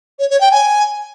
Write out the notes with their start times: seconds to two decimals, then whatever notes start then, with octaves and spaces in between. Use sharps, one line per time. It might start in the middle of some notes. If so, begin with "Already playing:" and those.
0.19 C#5
0.30 C#5
0.41 G5
0.52 G#5